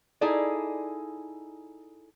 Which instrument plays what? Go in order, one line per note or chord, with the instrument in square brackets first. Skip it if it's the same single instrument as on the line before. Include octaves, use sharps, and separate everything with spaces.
[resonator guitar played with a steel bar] D#4 E4 G#4 A4 D5